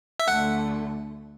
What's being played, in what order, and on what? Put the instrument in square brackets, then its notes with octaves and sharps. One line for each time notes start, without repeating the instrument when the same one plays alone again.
[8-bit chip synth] E5
[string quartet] D2 D3 A3 [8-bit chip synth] F#5